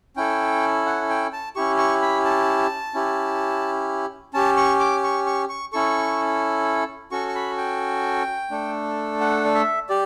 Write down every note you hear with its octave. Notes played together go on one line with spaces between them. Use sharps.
C#4 E4 A4 G5
F#5
G5
A5
C#4 E4 G4 C#6
C#6
B5
A5
C#4 E4 G4
C#4 G4 A5
C#6
D6
C#6
C#6
C#6
C#4 E4 A4 C#6
C#4 F#4 A4 C#6
C#6
B5
G5
A3 D4 A4
F#5
D5
E5
G4 D5